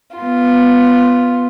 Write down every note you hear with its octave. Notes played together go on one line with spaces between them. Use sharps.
B3 F4